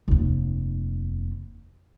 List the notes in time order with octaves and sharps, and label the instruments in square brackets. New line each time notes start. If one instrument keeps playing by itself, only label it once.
[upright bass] F1 D#2